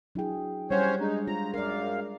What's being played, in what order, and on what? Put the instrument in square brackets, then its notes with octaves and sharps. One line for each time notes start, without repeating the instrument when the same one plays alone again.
[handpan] F#3 G#4 [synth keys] D4 E4 G5
[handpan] G3 F#5 [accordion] C#4 C5 C#5
[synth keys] G#3 D4 G#4 [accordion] D#4
[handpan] F4 [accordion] A#5
[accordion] F#2 F5 [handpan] A#4 D5